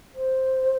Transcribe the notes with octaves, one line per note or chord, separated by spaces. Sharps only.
C5